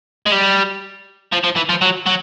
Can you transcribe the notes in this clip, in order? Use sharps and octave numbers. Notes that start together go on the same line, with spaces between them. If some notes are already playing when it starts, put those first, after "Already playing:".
G#3
G3
F3
F3
E3
F3
F#3
F#3